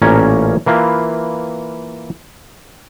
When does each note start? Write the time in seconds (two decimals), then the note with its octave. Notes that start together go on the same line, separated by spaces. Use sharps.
0.02 A1 A#2 A#3 C#4 A#4 C#5
0.66 E3 A#3 F4 B4